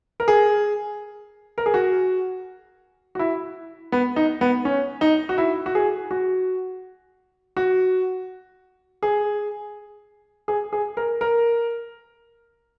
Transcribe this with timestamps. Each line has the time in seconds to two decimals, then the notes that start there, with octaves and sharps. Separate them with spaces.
0.20 A#4
0.28 G#4
1.58 A#4
1.66 G#4
1.74 F#4
3.15 F#4
3.19 E4
3.92 B3
4.16 D#4
4.41 B3
4.65 C#4
5.01 D#4
5.29 F#4
5.38 E4
5.66 F#4
5.75 G#4
6.11 F#4
7.57 F#4
9.03 G#4
10.48 G#4
10.73 G#4
10.97 A#4
11.21 A#4